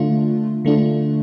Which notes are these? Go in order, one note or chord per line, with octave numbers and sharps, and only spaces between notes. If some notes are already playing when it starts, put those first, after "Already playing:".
Already playing: D3 A3 D4 F4
D3 A3 D4 F4